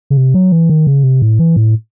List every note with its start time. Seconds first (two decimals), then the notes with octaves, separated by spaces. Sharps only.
0.10 C#3
0.17 C3
0.34 F#3
0.52 E3
0.69 D#3
0.87 C#3
1.03 C3
1.22 A2
1.39 E3
1.56 A2